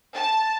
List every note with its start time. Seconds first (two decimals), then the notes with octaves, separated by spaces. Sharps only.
0.14 A5